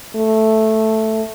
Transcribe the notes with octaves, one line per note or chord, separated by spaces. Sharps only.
A3